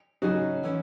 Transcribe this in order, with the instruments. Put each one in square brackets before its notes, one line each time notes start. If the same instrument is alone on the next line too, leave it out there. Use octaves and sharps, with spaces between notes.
[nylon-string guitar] C#3 F#3 C#4 G#4 [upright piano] D#4 F#4
[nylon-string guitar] E3 A3 C#4 E4